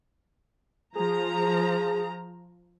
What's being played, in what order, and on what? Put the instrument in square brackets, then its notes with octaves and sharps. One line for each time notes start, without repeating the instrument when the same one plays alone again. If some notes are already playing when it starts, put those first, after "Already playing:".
[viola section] F3 A#5 [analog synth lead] G#4